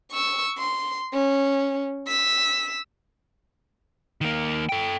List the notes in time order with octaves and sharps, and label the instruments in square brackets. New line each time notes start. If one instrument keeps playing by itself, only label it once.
[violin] C#6 E6
C6
C#4
E6 B6
[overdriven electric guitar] D#3 A#3
A4 G5